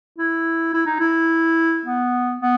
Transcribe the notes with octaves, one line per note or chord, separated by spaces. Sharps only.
E4
E4
D#4
E4
B3
B3